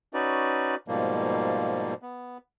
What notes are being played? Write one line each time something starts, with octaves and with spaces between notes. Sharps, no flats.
C#4 D#4 F#4 B4 D5
G#2 B2 F3 G3 A#3
B3